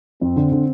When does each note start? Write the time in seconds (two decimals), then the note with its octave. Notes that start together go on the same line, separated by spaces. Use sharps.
0.21 F2 C4
0.36 D3
0.52 D3